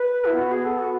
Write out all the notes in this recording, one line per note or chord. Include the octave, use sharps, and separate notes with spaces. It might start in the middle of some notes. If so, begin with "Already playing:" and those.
Already playing: B4
E4
B3 F#4
G#4
B3 A4
F#4